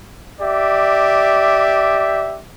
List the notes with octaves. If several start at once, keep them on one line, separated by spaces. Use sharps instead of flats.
G4 D5 E5